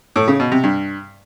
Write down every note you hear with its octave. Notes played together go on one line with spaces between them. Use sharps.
A2
C#3
B2
C3
G2